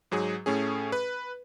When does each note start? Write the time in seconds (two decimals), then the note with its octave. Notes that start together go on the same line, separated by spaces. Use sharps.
0.12 G#2 F#3 G#4
0.46 A2 A3 C#4 G#4
0.92 B4